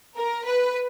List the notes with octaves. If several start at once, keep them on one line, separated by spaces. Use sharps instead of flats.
A#4
B4